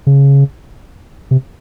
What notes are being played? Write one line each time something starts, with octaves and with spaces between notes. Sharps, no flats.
C#3
C3